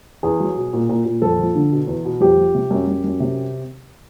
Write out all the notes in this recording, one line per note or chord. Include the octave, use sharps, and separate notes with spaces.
E2 G#4
F#3
B2
A#2
A#2
A#2
F2 A4
F3
D3
B2
E2
B2
F2 G4
F3
C3
F#2
F#2
F#2
C3